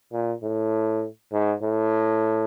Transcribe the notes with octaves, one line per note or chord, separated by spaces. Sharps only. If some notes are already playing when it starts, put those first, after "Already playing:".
A#2
A2
G#2
A2